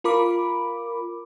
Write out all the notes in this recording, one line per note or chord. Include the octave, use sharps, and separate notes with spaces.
F4 A#4 B5 D6